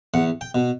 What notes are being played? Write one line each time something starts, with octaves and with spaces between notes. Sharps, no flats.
E2 F#5
G5
B2